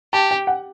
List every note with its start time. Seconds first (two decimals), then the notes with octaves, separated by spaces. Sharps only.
0.13 G4 A5
0.31 G5
0.47 F#5